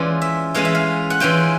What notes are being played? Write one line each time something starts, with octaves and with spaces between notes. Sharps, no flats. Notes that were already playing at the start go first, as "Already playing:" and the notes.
Already playing: E3 G#3 C#4 F4 D5
E5
E3 G#3 C#4 F4 F5
E5
F5
F#5
E3 G#3 C#4 F4 G5